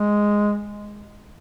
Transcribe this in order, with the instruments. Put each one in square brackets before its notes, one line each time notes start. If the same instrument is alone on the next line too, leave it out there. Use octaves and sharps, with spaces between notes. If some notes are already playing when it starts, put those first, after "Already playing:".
Already playing: [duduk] G#3